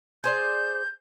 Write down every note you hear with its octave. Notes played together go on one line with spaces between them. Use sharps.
G#4 C5 D5 G6